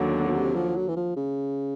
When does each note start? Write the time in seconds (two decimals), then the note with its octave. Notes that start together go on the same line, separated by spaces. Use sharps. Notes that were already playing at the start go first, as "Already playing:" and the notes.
Already playing: D#2 D3 F#3
0.14 B2
0.25 B2
0.34 C3
0.55 F3
0.76 F#3
0.88 E3
0.96 F3
1.16 C#3